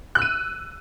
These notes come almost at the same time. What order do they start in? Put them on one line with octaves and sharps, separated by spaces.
F#6 E6 D#7